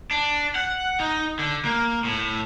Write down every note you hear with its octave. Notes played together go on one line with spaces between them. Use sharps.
D4
F#5
D#4
D3
A#3
A2